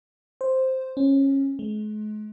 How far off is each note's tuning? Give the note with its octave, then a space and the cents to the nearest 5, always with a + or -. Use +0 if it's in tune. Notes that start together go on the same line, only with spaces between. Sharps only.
C5 +0
C#4 -20
G#3 +40